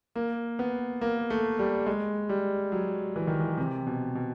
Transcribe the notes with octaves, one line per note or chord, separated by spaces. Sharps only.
A#3
B3
A#3
A3
G3
G#3
G3
F#3
E3
D#3
E3
C3
B2
B2